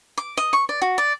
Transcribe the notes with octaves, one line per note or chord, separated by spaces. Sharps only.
D6
D#5
C#6
D5
F#4
D5